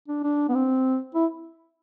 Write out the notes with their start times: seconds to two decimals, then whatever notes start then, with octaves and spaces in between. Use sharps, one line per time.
0.08 D4
0.24 D4
0.49 B3
0.54 C4
1.15 E4